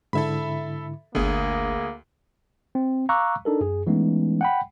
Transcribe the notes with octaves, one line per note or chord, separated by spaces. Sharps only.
G#2 D3 E4 A4 E5 B5
G1 D2 A#3 D4 G#4
C4
F5 A#5 C#6 D6 E6 F#6
D4 D#4 A4 A#4
F#2 G#4
E3 G#3 A3 B3 C#4 D#4
F#5 G5 B5